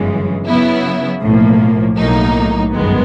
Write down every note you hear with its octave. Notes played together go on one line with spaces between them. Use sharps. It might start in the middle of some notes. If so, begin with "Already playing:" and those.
Already playing: G1 F#2 C#3 E3 G#3
C#3 F#3 B3 E4
B1 A2 F3 A#3
B1 A2 F#3 A#3 D#4
G1 F#2 D#3 G#3 B3